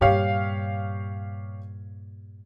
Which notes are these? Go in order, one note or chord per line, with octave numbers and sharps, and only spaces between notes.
G2 A#2 G4 C#5 F5